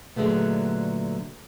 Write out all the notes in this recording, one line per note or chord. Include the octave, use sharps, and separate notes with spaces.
A#2 D3 F#3 G#3 A3 B3